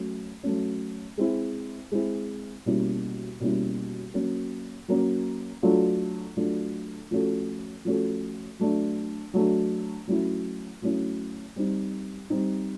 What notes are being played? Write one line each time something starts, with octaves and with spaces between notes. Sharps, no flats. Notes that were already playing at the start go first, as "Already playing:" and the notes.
Already playing: F#3 A3 C#4
F#3 A3 C#4
G#3 C4 E4
G#3 C4 E4
B2 G3 A#3 C#4 E4
B2 G3 A#3 C#4 E4
F#3 A#3 C#4
F#3 A#3 C#4
F#3 A3 D4 F4 A4
F#3 A3 D4 F4 A4
F3 A3 C#4 F#4 A4
F3 A3 C#4 F#4 A4
F#3 A3 D4
F#3 A3 D4
F#3 A3 C#4 E4
F#3 A3 C#4 E4
G3 C4 D#4
G3 C4 D#4